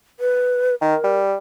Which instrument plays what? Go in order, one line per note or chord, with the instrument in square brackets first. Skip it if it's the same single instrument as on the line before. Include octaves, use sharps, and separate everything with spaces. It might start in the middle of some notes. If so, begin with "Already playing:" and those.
[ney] B4
[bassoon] D#3 [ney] A#4
[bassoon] G3